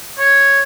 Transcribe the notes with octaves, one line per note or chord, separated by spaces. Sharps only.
C#5